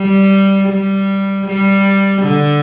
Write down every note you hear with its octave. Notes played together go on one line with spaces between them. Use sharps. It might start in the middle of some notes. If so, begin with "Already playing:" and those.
Already playing: G3
G3
G3
D3